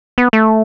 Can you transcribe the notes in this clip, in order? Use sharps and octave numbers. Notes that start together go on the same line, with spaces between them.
B3
A3